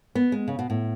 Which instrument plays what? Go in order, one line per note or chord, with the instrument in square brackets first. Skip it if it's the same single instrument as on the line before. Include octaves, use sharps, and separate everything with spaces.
[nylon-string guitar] B3
G#3
C#3
B2
A2